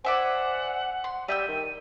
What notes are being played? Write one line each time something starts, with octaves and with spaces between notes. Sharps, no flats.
C5 D5 E5 F#5 G#5
C6
G3 E5 G5 E6 D#7
D#3